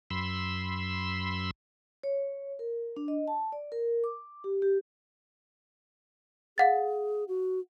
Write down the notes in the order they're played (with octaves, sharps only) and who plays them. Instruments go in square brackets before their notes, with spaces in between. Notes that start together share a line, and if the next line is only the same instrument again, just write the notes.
[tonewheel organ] F#2 B5 C6 E6
[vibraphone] C#5
A#4
D4
D#5
A5
D5
A#4
D6
G4
G4
[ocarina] G#4 [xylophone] F5 F#5 A6
[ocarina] F#4